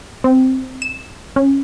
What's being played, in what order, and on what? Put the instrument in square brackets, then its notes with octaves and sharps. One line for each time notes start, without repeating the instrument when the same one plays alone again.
[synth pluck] C4
E7
C#4